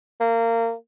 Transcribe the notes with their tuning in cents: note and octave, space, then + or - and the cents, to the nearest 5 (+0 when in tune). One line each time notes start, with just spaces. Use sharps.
A#3 -25